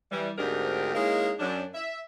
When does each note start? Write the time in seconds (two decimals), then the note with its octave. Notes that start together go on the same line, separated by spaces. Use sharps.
0.12 E3 G3
0.38 D2 G#2 C4 D4 G4 A#4
0.95 G#3 A#3 C#4 D#4 E4 A#4
1.40 F#2 D4
1.75 E5